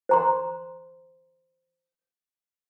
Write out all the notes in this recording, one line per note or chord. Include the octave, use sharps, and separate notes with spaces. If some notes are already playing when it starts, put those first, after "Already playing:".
C5 A#5 C6